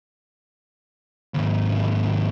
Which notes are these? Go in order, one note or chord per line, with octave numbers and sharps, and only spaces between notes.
D#2 G#2